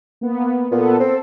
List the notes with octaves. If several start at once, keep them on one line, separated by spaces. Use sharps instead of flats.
A#3 B3
A#2 B3 A4
C4 A4